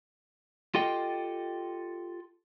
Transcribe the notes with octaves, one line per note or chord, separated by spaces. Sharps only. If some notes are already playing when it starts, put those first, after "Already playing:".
F4 G4 A4 D#5 G5